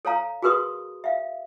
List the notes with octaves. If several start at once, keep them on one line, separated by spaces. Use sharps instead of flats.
A4 C#5 F5 A#5
F#4 G#4 A#4 B4 C6 D#6
E5 F5